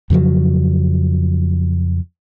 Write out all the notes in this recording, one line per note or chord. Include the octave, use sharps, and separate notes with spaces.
F2 C#3 F3 F#3